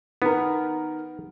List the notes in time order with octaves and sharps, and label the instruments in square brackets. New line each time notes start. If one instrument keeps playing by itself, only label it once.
[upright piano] D#3 A#4 [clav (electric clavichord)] B3